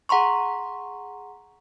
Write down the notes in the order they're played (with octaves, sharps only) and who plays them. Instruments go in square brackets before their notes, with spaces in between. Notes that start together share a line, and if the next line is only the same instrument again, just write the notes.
[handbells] G#4 F#5 A#5 C6 C#6